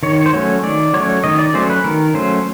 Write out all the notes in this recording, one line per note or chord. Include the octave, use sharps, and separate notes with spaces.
D#3 C#5
C5
F#3 A3 C#4 C#5
D#3 D5
F#3 A3 C#4 C#5
D#3 D#5
D5
F#3 A3 C#4 C5
B4
D#3 A#4
F#3 A3 C#4 C5